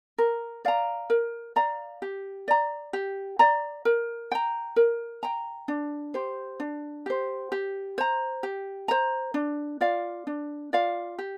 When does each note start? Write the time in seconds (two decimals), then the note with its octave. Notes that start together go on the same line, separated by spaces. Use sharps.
0.18 A#4
0.65 D5 F5 A#5
1.10 A#4
1.56 D5 F5 A#5
2.02 G4
2.48 D5 A#5
2.93 G4
3.39 D5 A#5
3.85 A#4
4.32 G5 A#5
4.76 A#4
5.23 G5 A#5
5.68 D4
6.14 G4 C5
6.60 D4
7.06 G4 C5
7.52 G4
7.98 C5 A#5
8.43 G4
8.88 C5 A#5
9.34 D4
9.81 F4 D5 F5
10.27 D4
10.73 F4 D5 F5
11.19 G4